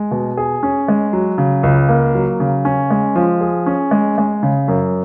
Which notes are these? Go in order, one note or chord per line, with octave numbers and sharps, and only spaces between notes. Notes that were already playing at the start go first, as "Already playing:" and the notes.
Already playing: G#3
B2
G#4
C#4
G#3
F#3
C#3
C#2
A#3
F#3
C#3
C#4
G#3
F3
G#4
C#4
G#3
G#3
C#3
F#2